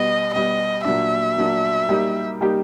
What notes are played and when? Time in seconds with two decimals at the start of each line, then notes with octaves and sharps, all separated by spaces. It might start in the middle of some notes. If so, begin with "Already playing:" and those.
Already playing: B2 G3 B3 D#5
0.33 B2 G3 B3 D#5
0.85 A#2 F#3 A#3 D4 E5
1.37 A#2 F#3 A#3 D4
1.89 G3 A#3 D#4 G4
2.41 G3 A#3 D#4 G4